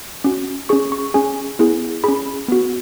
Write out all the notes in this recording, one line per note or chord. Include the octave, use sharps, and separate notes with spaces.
C#4 F#4
C#4 G#4 C#6
C#6
C#4 G#4 G#5
B3 E4 G#4
C#4 G#4 B5
B3 F#4